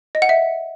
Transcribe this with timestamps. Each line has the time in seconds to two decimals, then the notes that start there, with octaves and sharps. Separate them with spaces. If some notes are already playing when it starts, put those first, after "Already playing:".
0.15 D#5
0.22 F#5
0.29 E5